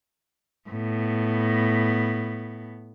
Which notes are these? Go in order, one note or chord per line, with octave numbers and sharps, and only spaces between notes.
A2 B3